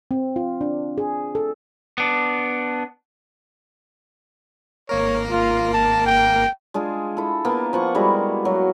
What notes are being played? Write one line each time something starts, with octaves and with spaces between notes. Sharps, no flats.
C4
F4
D4
G#4
A4
B3 D4
G#1 A#3 A#4 C#5
F4
A5
G5
G#3 D4 F4 G#4
E4 A4
A#3 B3
F3 F#5 C#6
G3 G#3 E4 F#4
F#3